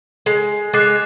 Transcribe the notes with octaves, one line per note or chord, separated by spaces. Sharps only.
G#3
G#3 D6 F#6 A6 C7